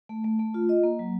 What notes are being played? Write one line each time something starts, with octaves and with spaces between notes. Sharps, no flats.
A3
A3
A3
F4
D#5
A#3
F#3